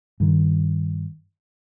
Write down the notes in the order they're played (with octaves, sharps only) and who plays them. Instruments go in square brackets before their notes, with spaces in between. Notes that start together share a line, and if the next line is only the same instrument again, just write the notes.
[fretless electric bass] G2 D#3